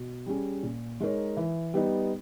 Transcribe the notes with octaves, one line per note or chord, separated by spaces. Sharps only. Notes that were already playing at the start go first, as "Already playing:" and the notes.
Already playing: B2
G3 C#4 G#4
A#2
G#3 D#4 A#4 C#5
E3
G3 B3 D#4